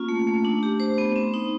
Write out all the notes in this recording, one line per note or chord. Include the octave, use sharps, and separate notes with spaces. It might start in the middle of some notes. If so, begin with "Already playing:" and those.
Already playing: A#3 C#4 F4
A3
A3
D4
G4
C5
B3
C4
D#4